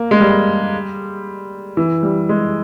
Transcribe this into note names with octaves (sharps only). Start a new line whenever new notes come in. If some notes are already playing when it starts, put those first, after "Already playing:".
Already playing: A#3
G#3
G3
E3
G3
G#3